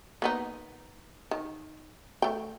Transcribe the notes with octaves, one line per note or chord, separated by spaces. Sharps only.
A#3 B3 D#4
D#3
A3 G5